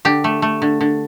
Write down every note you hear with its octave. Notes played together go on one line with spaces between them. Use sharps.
D3 G4
A3
A3
D3
D3